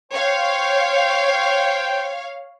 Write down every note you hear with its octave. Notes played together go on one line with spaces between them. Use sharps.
C5 C#5 F5 G5